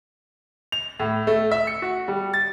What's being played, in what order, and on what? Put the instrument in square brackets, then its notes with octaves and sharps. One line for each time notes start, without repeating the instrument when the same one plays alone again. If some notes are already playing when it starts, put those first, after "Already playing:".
[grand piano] F7
A2
A3
E5
C#7
F#4
G3
A6